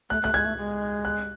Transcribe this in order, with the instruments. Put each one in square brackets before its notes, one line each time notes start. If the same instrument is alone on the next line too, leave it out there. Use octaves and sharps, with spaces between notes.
[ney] A3 [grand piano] F#6
[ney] A3 [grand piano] F#6
[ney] G#3 [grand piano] G#6
[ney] A3
G#3
[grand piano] F#6